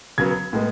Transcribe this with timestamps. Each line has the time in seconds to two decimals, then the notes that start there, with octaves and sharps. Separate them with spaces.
0.18 C#3 F#3 B3 G#6
0.53 A2 G#3 B3